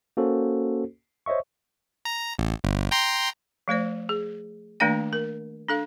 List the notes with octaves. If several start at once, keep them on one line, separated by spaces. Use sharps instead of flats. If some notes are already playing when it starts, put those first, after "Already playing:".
A#3 C#4 F#4 A4 C5
C5 C#5 D#5 E5 C#6
A#5
A1
G1
G5 A#5 C6
F3 A3 C5 D5
G#4
D#3 A3 A#3 D4 D5 G5
A#4
D4 A4 F5